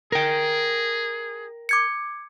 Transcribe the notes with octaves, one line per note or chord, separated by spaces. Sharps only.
G#4 A#4 G5
D6 G#6 C#7